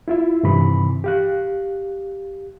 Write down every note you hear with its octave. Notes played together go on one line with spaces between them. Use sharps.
E4 F4 E5
G2 C3 D#3 E3 B5
G4 F5 F#6